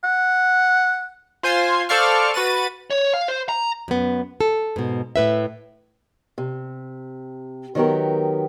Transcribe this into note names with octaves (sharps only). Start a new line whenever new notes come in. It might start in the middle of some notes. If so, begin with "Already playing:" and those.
F#5
F4 C5 G#5 C6
A4 C5 D5 F5 C#6 F6
F#4 B4 A6 D#7
C#5
F5
C5
A#5
F#2 B3
A4
G#2 B2
A2 B4 E5
C3
D#3 F#3 B3 G4 A#4